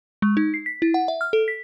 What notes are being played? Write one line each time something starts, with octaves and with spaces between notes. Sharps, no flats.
G#3
D#4
C7
B6
E4
F#5
E5
F6
A4
B6